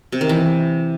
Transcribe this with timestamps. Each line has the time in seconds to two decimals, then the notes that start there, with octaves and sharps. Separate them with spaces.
0.12 C3
0.21 D#3
0.29 E3